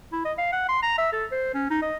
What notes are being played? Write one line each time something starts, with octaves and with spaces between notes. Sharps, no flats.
E4
D#5
F5
F#5
C6
A#5
E5
A4
C5
C#4
D#4
D#5